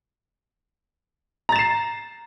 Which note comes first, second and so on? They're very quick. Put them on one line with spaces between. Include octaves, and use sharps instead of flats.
A#5 A6 E7 C7